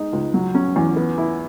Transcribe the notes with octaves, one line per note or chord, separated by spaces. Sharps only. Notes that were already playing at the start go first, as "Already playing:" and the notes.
Already playing: G#3 D#4
C#2
F#3
C#4
E2
B3
E4